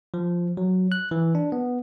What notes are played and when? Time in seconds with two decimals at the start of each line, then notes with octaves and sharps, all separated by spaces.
0.14 F3
0.57 F#3
0.92 F#6
1.11 E3
1.35 D4
1.52 B3